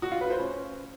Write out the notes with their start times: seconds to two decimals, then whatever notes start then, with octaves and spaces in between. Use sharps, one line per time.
0.02 F#4
0.12 F4
0.21 B4
0.30 C5
0.40 C#4